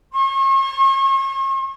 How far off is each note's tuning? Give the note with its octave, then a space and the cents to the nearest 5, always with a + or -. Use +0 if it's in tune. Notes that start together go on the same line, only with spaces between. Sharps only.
C#6 -45